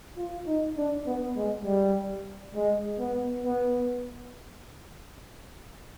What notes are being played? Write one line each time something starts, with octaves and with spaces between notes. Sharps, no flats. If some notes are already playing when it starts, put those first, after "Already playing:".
F4
D#4
D4
B3
G#3
G3
G#3
B3
B3